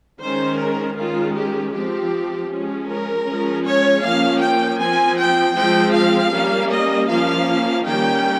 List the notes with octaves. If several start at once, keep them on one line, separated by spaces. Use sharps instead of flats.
D#3 G#3 C#4 C5
A#4
D#3 G#3 C#4 F4
G4
F3 C4 G4
F3 G#3 C#4
A#4
F3 G#3 C#4
C#5
F3 A#3 C#4 F5
G5
F3 C4 G#5
G5
F3 G#3 C4 G5
F5
G3 A#3 C#4
D#5
F3 A#3 C#4 F5
D#3 G3 A#3 C#4 G5